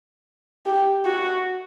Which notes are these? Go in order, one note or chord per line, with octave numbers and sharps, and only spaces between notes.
G4
F#4